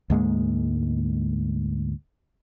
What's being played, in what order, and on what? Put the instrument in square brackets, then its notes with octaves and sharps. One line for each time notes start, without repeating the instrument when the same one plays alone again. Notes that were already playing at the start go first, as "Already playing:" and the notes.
[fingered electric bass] D2 G#2 G#3 A#3